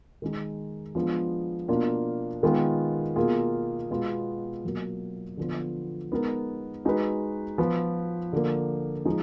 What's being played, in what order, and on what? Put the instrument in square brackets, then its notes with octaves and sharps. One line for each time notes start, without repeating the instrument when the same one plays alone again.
[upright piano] D#3 G#3 D#4
F3 G#3 B3 D4 F4
B2 A#3 D4 F4
D#3 G#3 B3 F4
B2 A#3 F4 G#4
B2 G#3 B3 F4
B2 F#3 A#3
D3 F3 B3 F4
G#3 B3 D#4 A#4
G#3 D#4 F#4 B4
F3 B3 F4 B4
D3 F3 A#3
F3 G#3 D#4 G#4